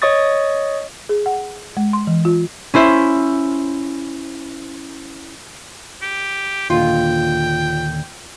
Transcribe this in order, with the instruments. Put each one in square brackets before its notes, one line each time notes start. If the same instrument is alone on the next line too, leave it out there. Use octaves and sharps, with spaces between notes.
[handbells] C#5 D#5 C#6 D#6 A6
[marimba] G#4
F#5
G#3
C6
E3
F4
[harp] C#4 E4 C5 E5
[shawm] G4
[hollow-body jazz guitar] D#2 A#2 D3 [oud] F4 [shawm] G5